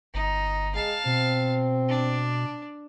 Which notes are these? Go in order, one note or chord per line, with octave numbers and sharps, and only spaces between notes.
G1 D#4
G#3 F5 A5
B2 C4
D4